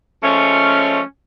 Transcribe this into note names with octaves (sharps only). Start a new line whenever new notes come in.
F3 G#3 A3 C#4